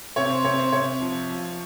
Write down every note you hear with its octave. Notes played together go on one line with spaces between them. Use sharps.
C3 C#5
C5
C3 C#5
C5
C3 C#5
F3
F3